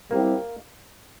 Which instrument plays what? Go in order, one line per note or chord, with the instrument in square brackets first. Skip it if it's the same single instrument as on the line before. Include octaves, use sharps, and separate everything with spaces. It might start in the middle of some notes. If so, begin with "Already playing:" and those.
[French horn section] G3 C4 E4 G4 [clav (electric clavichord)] A#3